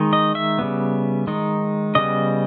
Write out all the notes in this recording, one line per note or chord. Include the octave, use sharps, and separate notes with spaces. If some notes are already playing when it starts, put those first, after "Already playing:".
Already playing: D#3 G#3 D#4
D#5
E5
C#3 G3 B3
D#3 G#3 D#4
C#3 G3 B3 D#5